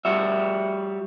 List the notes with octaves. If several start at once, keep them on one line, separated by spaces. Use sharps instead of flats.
G3 F#4 E5